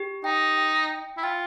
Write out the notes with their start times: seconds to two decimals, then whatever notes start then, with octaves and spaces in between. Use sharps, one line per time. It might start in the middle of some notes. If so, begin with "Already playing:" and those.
Already playing: G4
0.24 D#4 G5
0.57 G5
0.90 G5
1.17 E4
1.23 F4 G5